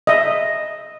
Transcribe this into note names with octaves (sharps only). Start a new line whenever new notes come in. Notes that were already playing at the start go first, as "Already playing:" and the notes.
D#5 E5